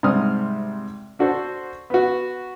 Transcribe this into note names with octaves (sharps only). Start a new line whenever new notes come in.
G#2 C3 G3 D#6 F6
D4 F#4 A4 C5
B3 F#4